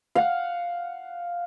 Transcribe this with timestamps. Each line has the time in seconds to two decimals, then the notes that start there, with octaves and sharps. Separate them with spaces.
0.15 F5 F#5